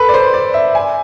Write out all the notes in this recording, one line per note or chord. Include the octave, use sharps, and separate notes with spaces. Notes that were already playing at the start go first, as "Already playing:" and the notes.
Already playing: A4 B4
D5
C5
D5
E5
G#5